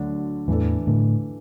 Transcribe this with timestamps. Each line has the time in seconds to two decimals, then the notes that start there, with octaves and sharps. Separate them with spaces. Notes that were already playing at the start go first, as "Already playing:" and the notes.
Already playing: D2 D3 F#3 D4
0.48 E2 A2 E3 D4 A4
0.87 A2 D3